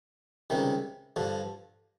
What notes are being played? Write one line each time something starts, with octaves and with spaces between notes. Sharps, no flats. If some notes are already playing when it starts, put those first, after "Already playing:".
C#2 C3 D#3 G3
G2 D3 F3